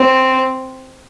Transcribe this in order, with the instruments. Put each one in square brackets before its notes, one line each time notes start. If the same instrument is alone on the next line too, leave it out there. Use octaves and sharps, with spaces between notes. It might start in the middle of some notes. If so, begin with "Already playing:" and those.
Already playing: [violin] C4